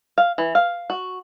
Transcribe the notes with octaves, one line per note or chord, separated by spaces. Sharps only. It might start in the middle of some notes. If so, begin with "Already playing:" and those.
F5
E3
F5
F#4